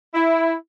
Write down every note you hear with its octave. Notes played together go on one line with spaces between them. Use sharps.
E4